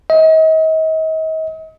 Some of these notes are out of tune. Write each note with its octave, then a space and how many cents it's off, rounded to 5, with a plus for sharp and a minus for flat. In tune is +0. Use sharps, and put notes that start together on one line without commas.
D#5 +40